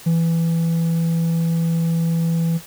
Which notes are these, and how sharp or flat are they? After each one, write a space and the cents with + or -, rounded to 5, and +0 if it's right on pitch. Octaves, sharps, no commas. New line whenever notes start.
E3 +10